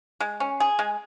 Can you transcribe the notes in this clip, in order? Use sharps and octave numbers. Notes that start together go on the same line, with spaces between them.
G#3
C#4
G#4
G#3